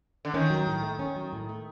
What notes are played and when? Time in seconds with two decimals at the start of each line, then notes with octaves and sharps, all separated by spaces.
0.25 D3
0.34 D#3 C#4
0.50 F#3
0.67 A2
0.83 A3
0.99 C#4
1.16 F#3
1.33 A2
1.49 A3